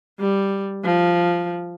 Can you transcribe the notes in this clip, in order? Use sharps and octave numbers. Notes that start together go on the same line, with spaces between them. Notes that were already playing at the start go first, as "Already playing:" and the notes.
G3
F3